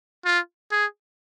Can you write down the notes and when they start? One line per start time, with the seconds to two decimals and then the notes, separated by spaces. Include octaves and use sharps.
0.25 F4
0.72 G#4